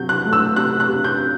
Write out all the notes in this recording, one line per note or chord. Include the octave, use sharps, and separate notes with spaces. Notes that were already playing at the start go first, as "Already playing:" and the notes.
Already playing: C3 F#3 G6
F#6
A3
E6
C3 F#6
F#6
C3
G6